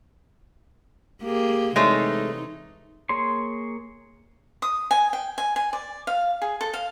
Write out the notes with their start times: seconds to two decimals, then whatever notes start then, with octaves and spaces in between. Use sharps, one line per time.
1.23 A#3 G4 G#4
1.76 C3 E3 G#3 A3 D#4 C#5
3.09 A#3 G#4 C#5 C6
4.62 D#6
4.91 G#5
5.13 G5
5.38 G#5
5.56 G#5
5.73 D5
6.07 F5
6.42 G#4
6.61 A4
6.73 F5